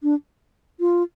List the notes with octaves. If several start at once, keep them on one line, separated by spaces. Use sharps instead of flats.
D4
F4